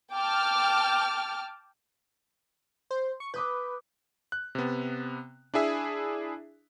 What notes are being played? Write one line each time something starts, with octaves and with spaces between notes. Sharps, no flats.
G5 A5 D6 F6
C5
C#6
B4 D6 D#6 G6
F#6
C3 B3
D4 E4 G#4 E5